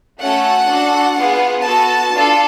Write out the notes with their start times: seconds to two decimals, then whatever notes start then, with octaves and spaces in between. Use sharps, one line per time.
0.19 A3 C#4 F#4 A4 F#5
0.67 D4 F#4 A4
1.16 B3 F4 G#4
1.64 B3 F#4 A4 A5
2.12 D4 F4 A4